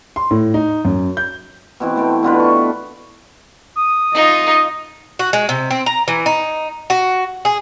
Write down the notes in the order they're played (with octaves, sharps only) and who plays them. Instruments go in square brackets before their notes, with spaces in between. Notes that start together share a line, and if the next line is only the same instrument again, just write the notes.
[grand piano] C6
A2
D#4
F#2
G6
[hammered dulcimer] B2 E3 C4
A3 C4 G5
B2 D3 F4 B4
C#6
[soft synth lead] D#6
[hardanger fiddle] D#4 F4 [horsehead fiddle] D#5
[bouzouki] F#4
G#3
C3
C4
A#5
E3
D#4
F#4
G#4